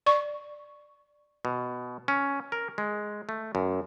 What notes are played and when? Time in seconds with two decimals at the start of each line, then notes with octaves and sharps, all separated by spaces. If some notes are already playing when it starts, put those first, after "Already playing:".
0.06 D5 C#6
1.45 B2
2.08 C#4
2.52 A#4
2.78 G#3
3.29 A3
3.55 F#2